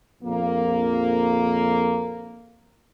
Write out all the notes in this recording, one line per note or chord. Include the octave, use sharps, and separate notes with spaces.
A#1 F2 A#3